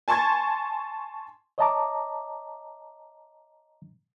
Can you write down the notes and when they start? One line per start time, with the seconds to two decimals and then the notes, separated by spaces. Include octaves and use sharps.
0.08 G#5 A5 C6 C#6 G#6 A6
1.58 C#5 D#5 E5 A5 A#5 D6